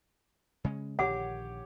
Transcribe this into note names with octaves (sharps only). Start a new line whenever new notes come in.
C#3 G#3 C#4
A#1 D3 D#3 G4 C#5 F#5 D6